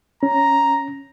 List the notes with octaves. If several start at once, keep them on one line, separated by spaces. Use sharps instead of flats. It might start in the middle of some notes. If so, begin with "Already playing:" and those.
C#4 A#5